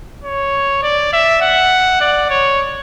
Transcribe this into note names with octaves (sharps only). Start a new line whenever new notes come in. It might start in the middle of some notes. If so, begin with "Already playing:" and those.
C#5
D5
E5
F#5
D5
C#5